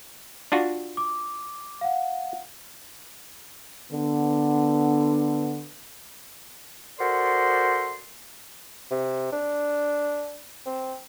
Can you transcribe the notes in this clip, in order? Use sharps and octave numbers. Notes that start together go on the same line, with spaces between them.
D4 F4 F#4
D6
F5 F#5
D3 B3
F#4 A4 A#4 C5 D5 C6
C3
D4
C4